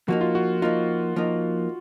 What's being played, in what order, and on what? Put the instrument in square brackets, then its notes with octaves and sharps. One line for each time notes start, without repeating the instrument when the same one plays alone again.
[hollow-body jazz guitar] F3 A#3 D#4 [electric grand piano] F#4
[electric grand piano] F4
F#4
[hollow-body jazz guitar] F3 A#3 D#4 [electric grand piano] F4
[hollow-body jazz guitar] F3 A#3 D#4